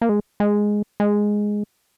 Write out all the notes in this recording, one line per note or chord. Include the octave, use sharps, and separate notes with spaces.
A#3
G#3
G#3
G#3